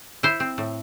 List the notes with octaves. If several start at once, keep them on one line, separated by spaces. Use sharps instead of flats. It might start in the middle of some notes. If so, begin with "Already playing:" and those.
E4 C5
C4
A2